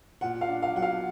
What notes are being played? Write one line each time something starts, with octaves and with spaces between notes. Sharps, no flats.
A#2 F#5
F5
D4
F5
F#3 F#5
F5